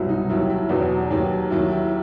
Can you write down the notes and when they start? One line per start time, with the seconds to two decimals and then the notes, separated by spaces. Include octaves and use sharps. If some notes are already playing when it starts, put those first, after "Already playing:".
Already playing: C2 B2 F#3 E4
0.09 D#4
0.29 D#2 D#3 F#3 E4
0.49 E4
0.69 E2 B2 F#3 D#4
1.10 D#2 D#3 F#3
1.50 D#2 D#3 F#3 E4
1.70 E4